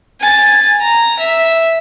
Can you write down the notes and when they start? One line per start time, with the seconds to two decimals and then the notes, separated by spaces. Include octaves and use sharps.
0.20 G#5 A6
0.81 A#5
1.20 E5